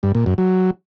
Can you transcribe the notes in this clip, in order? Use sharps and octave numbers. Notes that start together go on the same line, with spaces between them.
G2
A#2
F#2
F#3